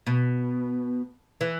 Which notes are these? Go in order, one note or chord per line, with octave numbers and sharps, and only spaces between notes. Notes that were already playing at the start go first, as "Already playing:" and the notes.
B2
E3